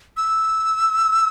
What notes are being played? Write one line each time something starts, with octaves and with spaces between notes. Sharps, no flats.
E6